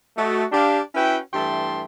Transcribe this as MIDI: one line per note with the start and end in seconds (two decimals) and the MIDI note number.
0.17 0.45 57
0.17 0.45 66
0.17 0.45 75
0.52 0.79 62
0.52 0.79 67
0.52 0.79 77
0.94 1.18 61
0.94 1.18 64
0.94 1.18 66
0.94 1.18 71
0.94 1.18 79
1.33 1.84 43
1.33 1.84 52
1.33 1.84 57
1.33 1.84 79
1.33 1.84 81
1.33 1.84 84